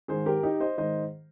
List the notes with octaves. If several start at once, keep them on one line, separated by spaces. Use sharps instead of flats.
G#2 D#3 G#4 C5
G4 A#4
D#4 G4
C5 D#5
G#2 D#3 C5 D#5